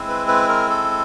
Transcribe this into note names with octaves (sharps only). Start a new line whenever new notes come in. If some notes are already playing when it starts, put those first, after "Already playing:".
Already playing: G#3 C4 E4
B4
B4
A#4
A4